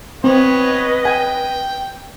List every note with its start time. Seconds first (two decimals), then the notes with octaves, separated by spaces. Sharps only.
0.24 B3 C4 B4 C#5 D#5
1.05 G5 G#5